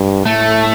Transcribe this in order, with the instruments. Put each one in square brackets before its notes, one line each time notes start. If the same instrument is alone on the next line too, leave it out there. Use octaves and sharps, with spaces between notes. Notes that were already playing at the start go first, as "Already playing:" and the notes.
Already playing: [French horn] G2
[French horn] A2 [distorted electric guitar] A3